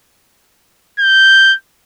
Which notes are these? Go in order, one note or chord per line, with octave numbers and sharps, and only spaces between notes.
G6